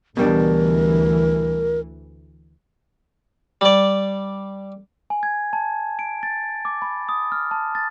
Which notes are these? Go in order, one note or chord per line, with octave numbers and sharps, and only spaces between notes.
D2 B2 E3 G3 D4 A#4
G3 D5
G#5
G#6
A5
D7
A6
D6
B5
D#6
F6
A5
A6